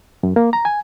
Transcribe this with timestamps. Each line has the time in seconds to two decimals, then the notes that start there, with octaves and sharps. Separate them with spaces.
0.23 F#2
0.36 A#3
0.53 A#5
0.65 G#5